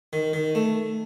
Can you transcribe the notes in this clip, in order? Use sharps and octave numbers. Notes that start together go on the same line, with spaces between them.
D#3
D#3
A3